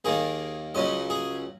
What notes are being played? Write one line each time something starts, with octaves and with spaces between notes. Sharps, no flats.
D#2 D#3 A#3 G#4
C#2 C#3 F#3 C#4 D#5
G#4